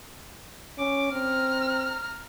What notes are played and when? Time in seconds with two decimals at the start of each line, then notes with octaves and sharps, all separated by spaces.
0.79 C#4 D6
1.13 C4 A#5 F6